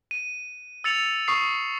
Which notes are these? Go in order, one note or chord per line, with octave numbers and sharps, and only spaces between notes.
D#7
E6 A6 C#7 F7
C#6 D#6 C7